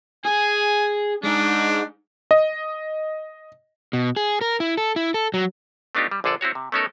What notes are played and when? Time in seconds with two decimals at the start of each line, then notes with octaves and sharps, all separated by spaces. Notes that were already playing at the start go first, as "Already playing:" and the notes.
0.25 G#4 G#5
1.23 G#3 D4 D#4
2.31 D#5
3.93 B2
4.16 G#4
4.41 A#4
4.60 E4
4.77 A4
4.96 E4
5.14 A4
5.34 F#3
5.95 A3 B3 D4 D#4 F4 G4
6.11 G3
6.24 A#1 D3 G#4 A4 D5
6.41 C4 E4 F#4 C#5
6.55 C3
6.72 A3 B3 C#4 D#4 A4 A#4